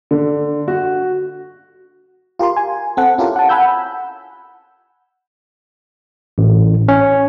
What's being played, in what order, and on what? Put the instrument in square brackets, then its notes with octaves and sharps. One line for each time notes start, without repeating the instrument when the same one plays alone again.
[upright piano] D3
F#4
[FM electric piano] F4 G4 A#4 C6
G#5
C4 A4 F#5
C#4 E4 F4 G4 A4 A#4
F#5 A5
F#5 G#5 B5 E6 G6
[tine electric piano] A1
C#4